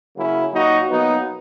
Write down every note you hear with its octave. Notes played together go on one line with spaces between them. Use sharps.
C#3 F#3 A#3 C#4 E4
A#2 F#3 A#3 D#4 F#4
B2 F#3 A#3 B3 D#4